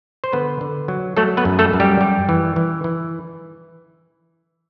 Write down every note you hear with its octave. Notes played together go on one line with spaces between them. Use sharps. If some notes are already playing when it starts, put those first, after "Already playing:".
C5
D3 B3 B4
D3
F#3
F#3 A3 A4
B3 B4
F#2
A3 A4
F#2
G3 G4
G3
E3
E3
E3